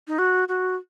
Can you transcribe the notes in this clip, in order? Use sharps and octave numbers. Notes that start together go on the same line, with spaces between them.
D#4
F#4
F#4